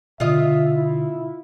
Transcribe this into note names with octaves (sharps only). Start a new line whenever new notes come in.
B2 D3 F4 D#5 E5
E4